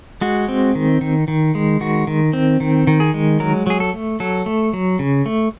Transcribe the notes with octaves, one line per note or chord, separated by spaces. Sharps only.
G#3 F#4
C4
D#3
D#3
D#3
G#3
D#3 F#4
D#3
C4
D#3
D#3
G#4
G#3
F#3 A#4
F#3 G#4
A4
A3
F#3 A4
A3
F#3
C#3
A3